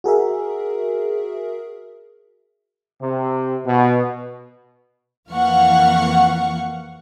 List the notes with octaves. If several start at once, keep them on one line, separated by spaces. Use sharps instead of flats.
F#4 G#4 A#4 E5
C3
B2
F2 E3 A#3 F5 F#5 C#6